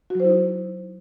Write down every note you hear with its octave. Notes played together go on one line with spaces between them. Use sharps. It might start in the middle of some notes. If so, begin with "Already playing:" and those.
F#3 D#4 E4 F#4 C5